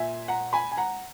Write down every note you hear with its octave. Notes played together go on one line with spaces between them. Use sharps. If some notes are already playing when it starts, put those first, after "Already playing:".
Already playing: A#2 E5 G#5
F#5 A#5
G#5 B5
G#5
F#5 A#5